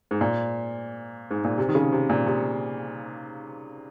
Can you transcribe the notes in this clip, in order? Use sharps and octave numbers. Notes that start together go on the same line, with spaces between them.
G#2
A#2
G#2
A#2
C3
D#3
C#3
C3
A#2
C3